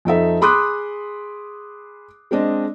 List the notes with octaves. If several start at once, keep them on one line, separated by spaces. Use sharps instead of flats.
F2 D#4 A4 E5
G#4 B5 C6 D6 D#6 F#6
G#3 C4 D4 D#5